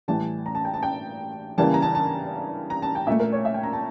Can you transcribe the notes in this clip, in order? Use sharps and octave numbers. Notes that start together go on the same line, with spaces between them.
A2 E3 G3 A5
A#5
A5
G5
A5
G5
C#3 E3 G3 A#3 A5
A#5
A5
A5
A#5
A5
G5
A#2 A3 E5
A#4
C#5
E5
G5
A#5
A5